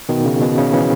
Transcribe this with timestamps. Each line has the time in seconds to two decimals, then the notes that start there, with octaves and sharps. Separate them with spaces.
0.09 B2 D#3
0.25 C#3
0.41 B2
0.58 C#3
0.73 C#3 E3